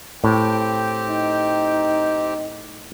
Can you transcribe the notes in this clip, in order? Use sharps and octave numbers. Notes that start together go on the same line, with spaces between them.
A2 C4 G4 G5
D#4